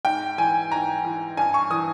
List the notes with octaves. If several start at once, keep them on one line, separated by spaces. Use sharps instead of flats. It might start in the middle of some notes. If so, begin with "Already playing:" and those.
G#2 G5
E3 G#5
G#2 A#5
E3
G2 G#5
C#6
E3 D#6